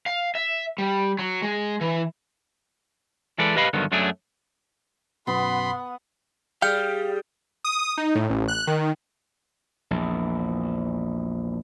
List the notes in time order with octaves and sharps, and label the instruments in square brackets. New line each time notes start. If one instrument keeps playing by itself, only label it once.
[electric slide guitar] F5
E5
G3
F#3
G#3
E3
[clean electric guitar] E3 G#3 A4 B4 D5
G4 B4 D#5 F5 B5
G2 D3 D#3 F#3 B3
F#2 F#3 A3 D4 G#4
[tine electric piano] B1 F#2 B2 [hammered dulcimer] B3 [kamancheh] F#5 [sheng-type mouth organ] B5 C6
[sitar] G3 [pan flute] G#4 [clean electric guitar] F5 G5 [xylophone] F6 G6 C#7
[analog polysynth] D#6
D#4
A2
A1
F#6
D#3
[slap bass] A#1 E2